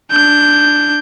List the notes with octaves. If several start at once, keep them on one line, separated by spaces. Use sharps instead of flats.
D4 G6